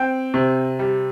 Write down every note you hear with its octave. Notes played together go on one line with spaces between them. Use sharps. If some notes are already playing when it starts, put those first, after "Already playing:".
Already playing: C4 G5
C3
G3